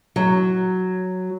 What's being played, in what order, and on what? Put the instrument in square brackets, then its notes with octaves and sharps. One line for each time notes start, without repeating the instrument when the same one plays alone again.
[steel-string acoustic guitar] F#3